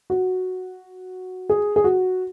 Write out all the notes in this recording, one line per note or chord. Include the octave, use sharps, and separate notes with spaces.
F#4
G#4
G#4
F#4